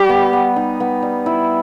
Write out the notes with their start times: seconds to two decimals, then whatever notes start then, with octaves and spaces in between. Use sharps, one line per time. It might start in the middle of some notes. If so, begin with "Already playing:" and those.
Already playing: G3 G4
0.09 B3
0.33 B3
0.56 D#4
0.80 B3
1.03 G3
1.26 E4